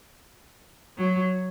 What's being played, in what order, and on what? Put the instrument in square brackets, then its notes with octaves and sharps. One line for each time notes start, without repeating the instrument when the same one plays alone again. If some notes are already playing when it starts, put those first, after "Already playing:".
[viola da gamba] F#3